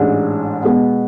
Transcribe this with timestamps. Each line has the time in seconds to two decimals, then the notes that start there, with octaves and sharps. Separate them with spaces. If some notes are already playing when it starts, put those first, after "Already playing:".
Already playing: A1 G#2 G#3 D4
0.63 B2 G#3 B3